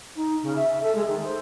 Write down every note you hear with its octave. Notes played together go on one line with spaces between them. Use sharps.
D#4
C#3
E5
A4
G#3
D#3
C5